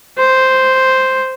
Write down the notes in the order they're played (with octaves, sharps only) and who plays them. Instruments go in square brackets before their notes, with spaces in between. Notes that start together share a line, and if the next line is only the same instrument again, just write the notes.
[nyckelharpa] C5